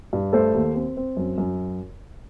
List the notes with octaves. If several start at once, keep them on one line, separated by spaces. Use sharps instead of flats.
G2
A3 A4 C5
D#2
C4
C4
F#2
F#2